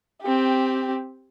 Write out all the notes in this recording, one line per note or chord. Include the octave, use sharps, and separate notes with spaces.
C4 G4